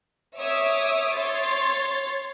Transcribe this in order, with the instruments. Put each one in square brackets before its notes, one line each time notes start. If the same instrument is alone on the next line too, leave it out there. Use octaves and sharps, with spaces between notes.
[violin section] C#5 E5 D6 D#6
C#5 C6 A6